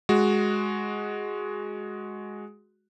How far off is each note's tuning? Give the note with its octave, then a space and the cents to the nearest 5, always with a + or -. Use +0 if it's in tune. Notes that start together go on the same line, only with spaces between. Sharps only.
G#3 +0 F#4 +0